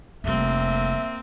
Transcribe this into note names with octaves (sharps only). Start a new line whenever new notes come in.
F1 G3 A#3 C4 E5